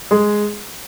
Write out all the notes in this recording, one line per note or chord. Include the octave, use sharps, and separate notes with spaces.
G#3 G#4